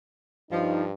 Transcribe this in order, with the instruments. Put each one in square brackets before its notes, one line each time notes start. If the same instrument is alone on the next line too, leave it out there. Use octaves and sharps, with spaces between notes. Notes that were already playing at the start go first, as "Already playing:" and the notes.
[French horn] G2 [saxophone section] F3 [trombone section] D#4